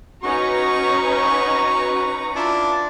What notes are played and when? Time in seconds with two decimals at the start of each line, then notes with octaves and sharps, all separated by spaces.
0.23 C#4 D#4 F#4 B4 A#5 C#6
2.36 D4 E4 F4 A5